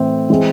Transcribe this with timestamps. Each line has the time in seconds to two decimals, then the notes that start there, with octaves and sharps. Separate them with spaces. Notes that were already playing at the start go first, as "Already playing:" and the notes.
Already playing: A2 E3 A3 C4
0.30 E3 G#3 C4